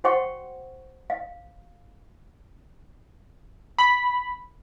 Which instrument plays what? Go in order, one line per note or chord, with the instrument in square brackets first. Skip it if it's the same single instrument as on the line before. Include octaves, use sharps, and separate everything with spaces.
[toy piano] F#4 C5 F#5 G5 C6 C#6
F5
[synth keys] B5